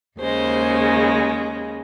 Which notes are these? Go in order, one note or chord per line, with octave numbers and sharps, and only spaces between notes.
D#2 C#3 G#3 C5